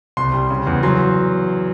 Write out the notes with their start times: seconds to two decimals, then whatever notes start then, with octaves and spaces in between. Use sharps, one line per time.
0.17 C2 C6
0.33 G3
0.50 C#3
0.67 E2
0.83 F#3 C6